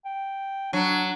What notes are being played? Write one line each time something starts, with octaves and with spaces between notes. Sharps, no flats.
G5
F#3 D4